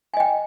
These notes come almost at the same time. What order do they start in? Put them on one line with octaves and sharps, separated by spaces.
G#5 D#5 G5